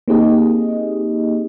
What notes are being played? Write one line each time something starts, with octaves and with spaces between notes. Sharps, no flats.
A#3 C4 D#4 G4 G#4 D#5